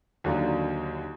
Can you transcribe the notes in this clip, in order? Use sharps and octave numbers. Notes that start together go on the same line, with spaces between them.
D#2 D3 F#3 A#3 D4